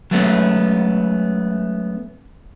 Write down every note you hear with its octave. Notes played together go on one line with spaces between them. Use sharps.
F#3 G#3 A3 B3 C#4